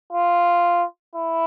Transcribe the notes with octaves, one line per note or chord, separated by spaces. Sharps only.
F4
E4